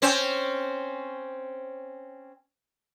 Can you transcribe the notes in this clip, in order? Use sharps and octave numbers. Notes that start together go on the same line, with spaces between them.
C4 C#4 C5